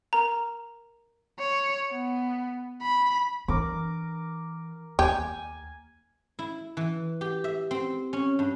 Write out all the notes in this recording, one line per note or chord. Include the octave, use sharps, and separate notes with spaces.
A#4 A#5
C#5
B3
B5
E3 D4 A#4 D6
D#2 G4 G#5
E4
E3
G4
E5
C4
C#4
G2